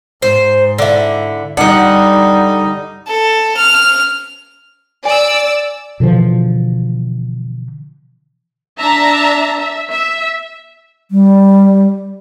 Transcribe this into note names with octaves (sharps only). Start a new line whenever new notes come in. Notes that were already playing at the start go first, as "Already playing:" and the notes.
G#2 C5
D3 E4
D3 G3 D#4 F#5
A4
F6
D5 G#5 E6
B2 D3 E3 F3
D4 E5 A5 A#5
E5
E5
G3